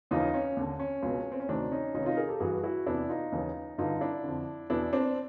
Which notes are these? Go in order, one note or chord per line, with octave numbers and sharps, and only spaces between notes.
D#2 C#3 E3 D#4 F4
C#4
D#2 D3
C#4
C#2 B2
C4
C#4
D2 C3 D#3 C4 D4
C#4 D#4
C#2 C3 D#3 C#4 D#4
D#4 F4
G#4 A#4
G4 A4
G2 E3 F#4 G#4
E4 F#4
E2 C3 E3 D4 E4
D#4 F4
D#2 C#3 E3
G2 D3 D#4 F4
D4 E4
F2 D3
E2 B2 D4 E4
C4 D4